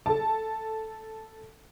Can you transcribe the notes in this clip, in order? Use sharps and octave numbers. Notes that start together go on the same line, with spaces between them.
A4 A5